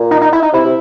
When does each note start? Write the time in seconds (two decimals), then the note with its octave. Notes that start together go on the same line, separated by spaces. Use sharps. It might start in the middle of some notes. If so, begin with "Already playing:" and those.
Already playing: A#2
0.11 D#4
0.21 D#4
0.32 E4
0.42 D#4
0.53 C3 E4
0.65 C3